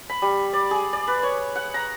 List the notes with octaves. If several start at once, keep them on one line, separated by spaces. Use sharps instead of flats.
B5
G3
D5
G#4
D5
B4
C#5
F#5
A#5